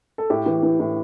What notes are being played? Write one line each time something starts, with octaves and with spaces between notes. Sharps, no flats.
A4
A2 G4
E3
E3
A2